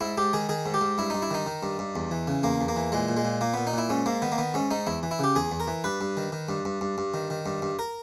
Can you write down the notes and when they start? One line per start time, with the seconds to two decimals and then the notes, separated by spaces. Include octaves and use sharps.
0.01 G#2 E4
0.18 G#2 G4
0.33 D#3 G#4
0.49 D#3 G#4
0.66 G#2
0.74 G4
0.81 G#2
0.98 G2 E4
1.10 G2 D#4
1.22 E4
1.31 D#3 D#4
1.46 D#3
1.63 G2
1.79 G2
1.96 E2
2.11 E3
2.28 C#3
2.43 E2 A#3
2.61 E2
2.68 A#3
2.76 E3
2.92 A#2 G#3
3.09 A#2
3.17 G#3
3.25 A#2
3.41 A#2 A#3
3.54 A#2 B3
3.67 D#4
3.73 A#2 E4
3.89 G#2 C#4
4.06 G#2 A#3
4.22 D#3 B3
4.32 A#3
4.38 D#3 B3
4.54 G#2 C#4
4.71 G#2 D#4
4.87 E2 E4
5.03 E3
5.11 E4
5.19 C#3 G4
5.35 E2 G#4
5.51 E2
5.60 A#4
5.67 E3
5.84 G2 B4
6.01 G2
6.17 D#3
6.32 D#3
6.49 G2
6.65 G2
6.81 G2
6.98 G2
7.14 D#3
7.30 D#3
7.46 G2
7.62 G2
7.79 A#4